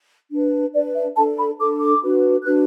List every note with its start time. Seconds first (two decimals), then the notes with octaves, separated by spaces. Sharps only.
0.31 D4 B4
0.74 D4 B4 D5
0.95 E5
1.16 D4 A4 A5
1.37 B5
1.58 D4 A4 D6
1.81 D6
2.02 D4 F#4 B4
2.44 D4 F#4 B4 F#6